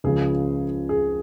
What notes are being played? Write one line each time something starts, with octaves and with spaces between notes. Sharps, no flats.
C#2 C#3 F3 G#4
G#4